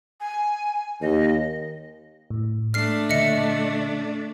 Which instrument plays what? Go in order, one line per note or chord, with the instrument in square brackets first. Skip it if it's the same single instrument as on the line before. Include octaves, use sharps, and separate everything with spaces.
[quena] G#5
[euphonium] D#2 [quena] D#5
[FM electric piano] A2
[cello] A3 D4 [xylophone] F6 C7
[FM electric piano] A#2 D3 [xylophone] D#5 E5 C#7